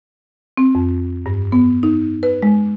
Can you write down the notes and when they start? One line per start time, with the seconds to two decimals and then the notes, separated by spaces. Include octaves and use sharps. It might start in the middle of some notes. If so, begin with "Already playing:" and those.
0.57 C4
0.75 F2
1.26 G2
1.52 B3
1.83 D#4
2.23 B4
2.42 G#3